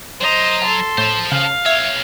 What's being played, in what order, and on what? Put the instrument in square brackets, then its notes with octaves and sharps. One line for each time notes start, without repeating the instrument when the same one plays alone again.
[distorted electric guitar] F#3 A#5 [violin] C5 D#5
[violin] A4 C6
[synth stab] A2 [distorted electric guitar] C5 A5
[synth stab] C#3 [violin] F5
[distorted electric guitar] B1 C#5 [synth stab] E5